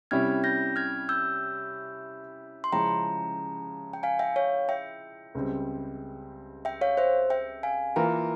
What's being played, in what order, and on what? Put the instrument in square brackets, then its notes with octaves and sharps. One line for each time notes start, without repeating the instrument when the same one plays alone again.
[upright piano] C3 G3 C#4 E4 [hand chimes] F6 G#6
[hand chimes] G6 A#6
F6 G#6
E6 G6
C6
[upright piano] C#3 F3 G#3 C#4 E4 [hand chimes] G5 A#5
[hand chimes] G5
F5 G#5
E5 G5
C#5 F5
E5 G5
[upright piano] C#2 C#3 G3 C4
[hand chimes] E5 G5
C#5 F5
C5 E5
E5 G5
F5 G#5
[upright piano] E3 A#3 F4 A#4 [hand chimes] G5 A#5